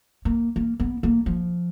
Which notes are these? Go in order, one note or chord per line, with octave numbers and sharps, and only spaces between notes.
A#3
A#3
B3
A#3
F3